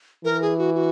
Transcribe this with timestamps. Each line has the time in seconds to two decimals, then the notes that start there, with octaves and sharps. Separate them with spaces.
0.25 E3 A#4
0.42 G#4
0.58 F#4
0.74 F#4